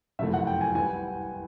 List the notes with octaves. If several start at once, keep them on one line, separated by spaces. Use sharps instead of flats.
F#1 F2 C3 F3 A3 E5
F#5
G5
G#5
E3 G3 G#5